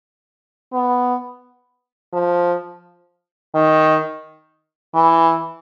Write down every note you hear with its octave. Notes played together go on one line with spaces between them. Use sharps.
B3
F3
D#3
E3